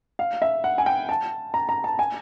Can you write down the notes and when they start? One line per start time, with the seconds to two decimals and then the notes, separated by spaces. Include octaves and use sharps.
0.19 F5
0.42 E5
0.64 F#5
0.78 G#5
0.86 G5
1.09 A5
1.54 A#5
1.69 A#5
1.84 A5
1.99 G#5